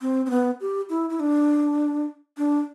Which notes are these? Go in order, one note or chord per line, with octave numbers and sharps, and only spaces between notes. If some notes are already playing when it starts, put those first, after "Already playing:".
C4
C4
B3
G4
E4
E4
D4
D4